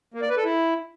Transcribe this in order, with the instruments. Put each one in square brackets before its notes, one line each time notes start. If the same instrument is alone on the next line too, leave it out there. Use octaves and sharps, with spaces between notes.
[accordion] A#3
D5
B4
A4
E4